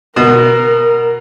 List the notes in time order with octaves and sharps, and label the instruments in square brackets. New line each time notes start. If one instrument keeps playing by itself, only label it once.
[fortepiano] B2 [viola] A#4